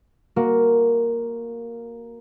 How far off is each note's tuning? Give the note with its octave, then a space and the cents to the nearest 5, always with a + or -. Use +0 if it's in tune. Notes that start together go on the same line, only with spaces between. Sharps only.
A#3 +0 F#4 -5